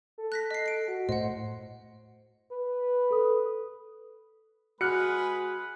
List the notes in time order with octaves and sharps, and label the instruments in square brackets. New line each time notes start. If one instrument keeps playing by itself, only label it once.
[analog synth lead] A4
[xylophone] F#6 A#6 B6
D#5 C7
C7 D7
[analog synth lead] F#4
[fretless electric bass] A2 [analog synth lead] C5 [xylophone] D#5 F#5
[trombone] B4
[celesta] A4 D#6
[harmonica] G#3 G#4 B4 [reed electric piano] F#4 [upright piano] F6 F#6 C#7